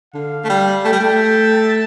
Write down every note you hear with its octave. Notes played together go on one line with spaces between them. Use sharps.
D3 F5
A3
G3
A3 G5
G3
A3
A5